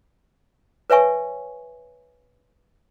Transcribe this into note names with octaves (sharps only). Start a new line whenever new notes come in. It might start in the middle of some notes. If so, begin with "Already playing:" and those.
B4 C#5 E5 G#5 C#6